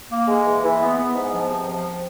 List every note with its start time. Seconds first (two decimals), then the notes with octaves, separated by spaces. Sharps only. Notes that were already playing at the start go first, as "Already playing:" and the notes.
0.10 A#3
0.28 G#3
0.46 E3
0.63 E3
0.81 B3
0.98 B3
1.15 G#2
1.33 F3
1.50 C3
1.68 F3